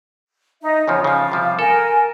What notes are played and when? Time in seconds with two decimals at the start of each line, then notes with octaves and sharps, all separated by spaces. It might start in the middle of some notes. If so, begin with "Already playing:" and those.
0.62 D#4 E5
0.88 E2 C#3 F3 C#5
1.04 C#3 F3 F5
1.32 C3 F3 G3
1.59 A4 A#4 G#5